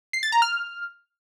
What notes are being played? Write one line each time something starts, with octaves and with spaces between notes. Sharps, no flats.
C7
A6
A#5
F6